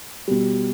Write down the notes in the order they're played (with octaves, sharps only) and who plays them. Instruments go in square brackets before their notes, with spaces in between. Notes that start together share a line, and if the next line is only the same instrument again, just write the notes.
[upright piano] B2 G3